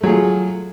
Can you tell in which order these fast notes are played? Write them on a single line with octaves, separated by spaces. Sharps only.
A3 F#3 G#4 F4